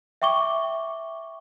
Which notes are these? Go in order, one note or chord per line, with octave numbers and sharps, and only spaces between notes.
E5 G5 C#6 D6 G7